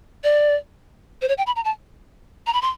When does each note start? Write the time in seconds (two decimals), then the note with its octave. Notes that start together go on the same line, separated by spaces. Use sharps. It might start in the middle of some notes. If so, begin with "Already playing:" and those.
0.24 D5
1.22 C5
1.28 C#5
1.38 G5
1.46 B5
1.56 A#5
1.64 A5
2.47 A#5
2.53 B5
2.62 C6